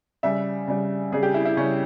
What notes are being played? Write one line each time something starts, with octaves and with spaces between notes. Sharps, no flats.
C#3 G3 E5
C#3 G3
C#3 G3 G#4
G4
E4
E4
C#3 G3 C#4